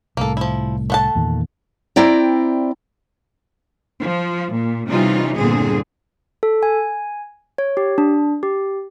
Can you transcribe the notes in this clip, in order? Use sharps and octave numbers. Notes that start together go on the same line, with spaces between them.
C2 A2 A#3 A4
F3 E4
A3 F#5 A5
E2 A#2 D#3
C4 E4 D5 G5 A#5
F3
A#2
C3 E3 G3 C#4 D#4 F4
E2 G2 A#2 D3 C4 G#4
A4
G#5
C#5
G4
D4
G4